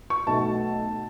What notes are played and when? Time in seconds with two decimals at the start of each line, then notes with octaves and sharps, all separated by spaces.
0.10 C#6
0.27 B1 B2 A3 A5